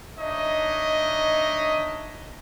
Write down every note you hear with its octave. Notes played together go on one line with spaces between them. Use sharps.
D4 D#4 C#5 D#5 E5